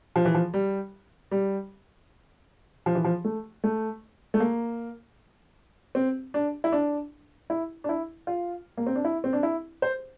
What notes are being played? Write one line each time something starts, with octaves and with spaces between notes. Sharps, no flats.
F3
E3
F3
G3
G3
F3
E3
F3
A3
A3
A3
A#3
C4
D4
E4
D4
E4
D4
E4
F4
A#3
C4
D4
E4
C4
D4
E4
C5